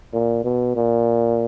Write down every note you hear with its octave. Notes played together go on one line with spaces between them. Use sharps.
A#2
B2
A#2